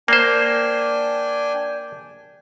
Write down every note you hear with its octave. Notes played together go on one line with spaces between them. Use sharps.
A#3 D4 C5 G5 G#5